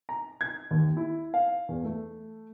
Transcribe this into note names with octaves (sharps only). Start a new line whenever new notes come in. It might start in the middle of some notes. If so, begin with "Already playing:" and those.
A#5
G#6
D#2
E4
F5
E2
A3